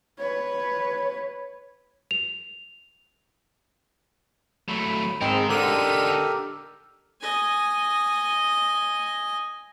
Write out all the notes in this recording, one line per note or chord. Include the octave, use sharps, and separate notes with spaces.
B4 C#5
F7
F#3 A3 B5
G#2 G#3 C4 A#4 D#5
D3 D4 D#4 G4 A4 A#4 B6 D#7
D#5 G#5